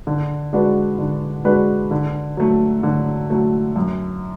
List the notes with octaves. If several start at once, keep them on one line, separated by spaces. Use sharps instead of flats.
D3
G#3 D4 F#4 B4
D3
G#3 D4 F#4 B4
D3
F#3 A3
D3
F#3 A3
F#2